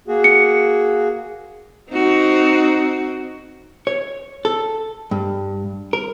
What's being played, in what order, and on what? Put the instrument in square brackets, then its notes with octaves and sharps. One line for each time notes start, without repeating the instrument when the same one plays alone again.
[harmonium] A#3 F#4 G#4
[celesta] C#7
[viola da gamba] C4 D#4 F#4
[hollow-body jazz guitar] C#5
A4
G2
A#4